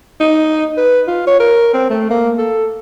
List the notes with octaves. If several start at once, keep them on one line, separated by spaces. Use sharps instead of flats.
D#4
B4
F4
C#5
A#4
C4
A3
A#3
A4